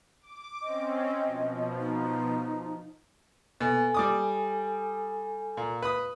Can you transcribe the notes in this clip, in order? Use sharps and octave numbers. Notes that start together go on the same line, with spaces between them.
D6
C4 C#4 D#5
B2 F3
D#4
B2 A4 G#5
G3 D6 D#6
A#2
B4 B5 D#6